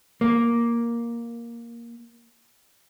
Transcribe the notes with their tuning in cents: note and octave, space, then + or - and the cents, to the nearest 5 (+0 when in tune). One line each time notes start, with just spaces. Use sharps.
A#3 +5